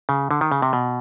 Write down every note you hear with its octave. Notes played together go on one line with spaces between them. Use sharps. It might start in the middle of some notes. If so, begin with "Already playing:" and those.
C#3
D3
D#3
C#3
C3
B2